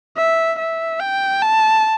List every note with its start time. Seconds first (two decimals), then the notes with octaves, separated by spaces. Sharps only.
0.17 E5
0.59 E5
1.00 G5
1.42 A5